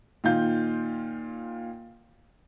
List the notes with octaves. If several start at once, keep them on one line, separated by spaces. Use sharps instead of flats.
A#2 D#3 F4 G6